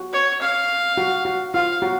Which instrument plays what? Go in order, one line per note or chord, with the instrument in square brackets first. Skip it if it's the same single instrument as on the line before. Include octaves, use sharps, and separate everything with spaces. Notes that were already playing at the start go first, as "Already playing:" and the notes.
Already playing: [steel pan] F#4
[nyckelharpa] C#5
F5
[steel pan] F#4
F#4
[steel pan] F4 [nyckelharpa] F5
[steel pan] F#4